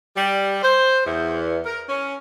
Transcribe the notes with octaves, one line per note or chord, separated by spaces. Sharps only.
G3
C5
E2
A#4
C#4